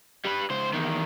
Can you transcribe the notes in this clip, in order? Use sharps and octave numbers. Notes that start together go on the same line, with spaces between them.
G3 B4
C#2 C5
E2 D#3